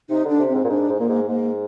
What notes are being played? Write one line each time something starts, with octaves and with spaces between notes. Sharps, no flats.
C3 D#4
D3 D4
C3
C4
G#2
A#2
G#2 D4
G#2
A#2 A#3
G#2
G#2 A#3